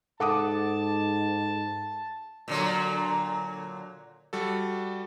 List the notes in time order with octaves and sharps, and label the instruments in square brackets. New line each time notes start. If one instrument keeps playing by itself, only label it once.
[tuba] G#2 [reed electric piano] A4 [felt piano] F#5 D6 D#6 [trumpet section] A5
[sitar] A#2 D3 F#3
[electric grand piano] G3 F#4 A4